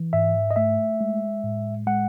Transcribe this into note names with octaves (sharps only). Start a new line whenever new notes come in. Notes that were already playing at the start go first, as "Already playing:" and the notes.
Already playing: E3
G#2 E5
D#5
A3 E5
G#3
A2
G#3 F#5